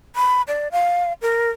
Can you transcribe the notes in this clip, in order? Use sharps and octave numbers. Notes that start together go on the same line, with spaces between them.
B5
D5
F5
A#4